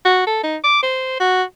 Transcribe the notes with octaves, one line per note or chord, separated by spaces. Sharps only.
F#4
A4
D#4
D6
C5
F#4